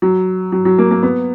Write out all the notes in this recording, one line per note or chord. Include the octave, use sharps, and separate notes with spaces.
F#3
F#3
F#3
A#3
A#3
B3